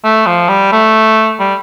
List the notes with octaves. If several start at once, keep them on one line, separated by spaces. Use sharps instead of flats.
A3
F3
G3
A3
G3